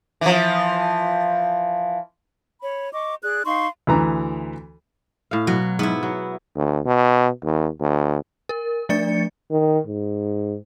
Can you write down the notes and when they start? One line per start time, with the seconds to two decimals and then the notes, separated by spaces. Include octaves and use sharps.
0.21 E3 F3
2.61 C#5 B5
2.93 D#5 C#6 D6
3.24 G#4 D5 F#6
3.46 D#4 F5 C6 C#6
3.87 D2 E3 A#5
5.31 A2 F5
5.47 B2 F#3
5.79 G#2 B3 E4
6.03 F#3
6.56 D2
6.85 B2
7.43 D#2
7.80 D2
8.49 A#4
8.89 F3 A3 D4 D5 A6 C#7
9.51 D#3
9.87 G#2